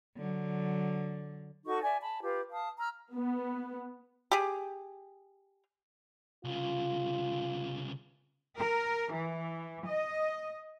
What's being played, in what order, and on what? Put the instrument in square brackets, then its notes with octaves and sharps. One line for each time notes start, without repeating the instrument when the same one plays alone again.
[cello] D3 F#3
[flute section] D#4 F#4 A4 C#6
D5 E5 G#5
A5 B5
F4 G4 B4
F5 A5 D#6
A#5 E6 F6
[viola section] B3
[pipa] G4 G#4
[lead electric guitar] C2 C#3 [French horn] F4
[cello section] A#4
E3
D#5